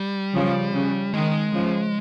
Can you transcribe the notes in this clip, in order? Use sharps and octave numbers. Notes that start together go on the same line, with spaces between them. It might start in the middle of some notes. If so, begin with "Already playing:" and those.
Already playing: G3
C#3 F3
C#3
D#3 G#3
C#3 F3